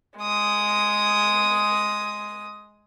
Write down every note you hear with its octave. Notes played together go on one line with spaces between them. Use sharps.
G#3 D#6